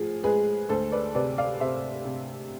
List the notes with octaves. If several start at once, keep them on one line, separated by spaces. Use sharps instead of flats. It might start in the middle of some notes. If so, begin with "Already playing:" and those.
Already playing: A2 F3 G#4
G#3 G#4 B4
D2 A4 C5
B4 D5
C3 B4 D5
D5 F5
C3 C5 E5
C3